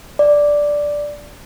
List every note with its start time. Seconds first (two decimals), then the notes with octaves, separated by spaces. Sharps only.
0.19 D5